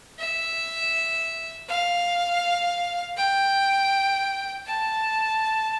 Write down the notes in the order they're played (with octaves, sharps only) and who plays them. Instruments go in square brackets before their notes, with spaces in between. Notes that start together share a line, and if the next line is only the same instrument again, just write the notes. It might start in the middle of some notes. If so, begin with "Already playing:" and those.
[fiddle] E5
F5
G5
A5